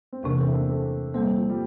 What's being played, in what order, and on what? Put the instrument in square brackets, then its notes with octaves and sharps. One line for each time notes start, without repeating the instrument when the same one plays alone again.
[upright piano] C4
[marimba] E2 C3 E3 [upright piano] A#3 D4
[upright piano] A3 C4
E4
A#3 D4
A3 C4
[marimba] A#2 G3 A#3 [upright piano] A3 C4
[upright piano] F3
G3